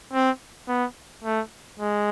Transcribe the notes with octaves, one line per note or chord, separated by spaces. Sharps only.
C4
B3
A3
G#3